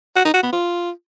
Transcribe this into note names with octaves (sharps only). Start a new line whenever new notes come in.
F#4
D#4
F#4
B3
F4